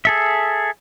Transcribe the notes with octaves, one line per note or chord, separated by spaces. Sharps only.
G#4 A4 E5